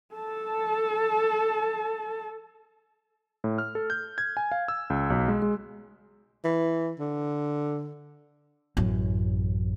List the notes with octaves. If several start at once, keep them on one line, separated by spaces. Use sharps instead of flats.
A4 A5
A2
F6
A4
G6
G#6
G#5
F5
E6
C#2
B1
G#3
G#3
E3
D3
A1 F#2